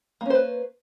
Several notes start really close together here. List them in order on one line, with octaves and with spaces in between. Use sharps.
A#3 C#4 C5 B4